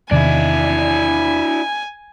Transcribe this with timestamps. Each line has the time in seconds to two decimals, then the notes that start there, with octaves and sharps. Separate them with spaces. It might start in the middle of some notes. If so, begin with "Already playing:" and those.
0.11 E2 C3 D#3 D4 E4 G#5